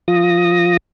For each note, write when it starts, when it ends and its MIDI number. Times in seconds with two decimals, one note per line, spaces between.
0.08 0.77 53
0.08 0.77 65
0.08 0.77 87
0.08 0.77 94